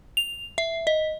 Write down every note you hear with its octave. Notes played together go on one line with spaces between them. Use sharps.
F7
E5
D#5